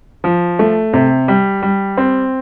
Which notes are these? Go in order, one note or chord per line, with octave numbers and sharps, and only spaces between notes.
F3
A3
C3
G3
G3
C4